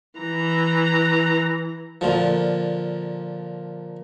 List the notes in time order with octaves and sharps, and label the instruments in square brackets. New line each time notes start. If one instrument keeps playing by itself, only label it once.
[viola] E3 A#5
[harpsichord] A#2 D3 F3